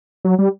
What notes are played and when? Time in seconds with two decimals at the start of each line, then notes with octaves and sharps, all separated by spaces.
0.25 F#3
0.39 G3